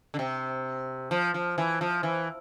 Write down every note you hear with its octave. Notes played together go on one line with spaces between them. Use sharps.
D3
C3
F3
F3
E3
F3
E3